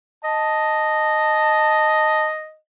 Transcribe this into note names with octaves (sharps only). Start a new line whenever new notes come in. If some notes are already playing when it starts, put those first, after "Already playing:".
D#5 A5